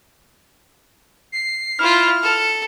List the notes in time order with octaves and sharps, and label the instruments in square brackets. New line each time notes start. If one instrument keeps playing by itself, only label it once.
[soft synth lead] C7
[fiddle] E4 F4 [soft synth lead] F6
[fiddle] A4